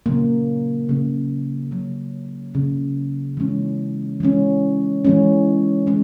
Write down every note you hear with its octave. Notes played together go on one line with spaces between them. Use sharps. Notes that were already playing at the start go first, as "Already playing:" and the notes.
C#3 F#3 A#3
C#3 F#3 A#3
C#3 F#3 A#3
C#3 F#3 A#3
E3 G#3 C#4
E3 G#3 C#4
E3 G#3 C#4
E3 G#3 C#4